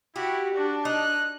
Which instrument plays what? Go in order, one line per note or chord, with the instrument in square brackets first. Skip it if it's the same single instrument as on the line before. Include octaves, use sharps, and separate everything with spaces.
[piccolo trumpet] E4 [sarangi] F#4 [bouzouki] G4
[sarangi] D4 [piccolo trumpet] F#4
[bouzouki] D#4 [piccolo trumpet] F#6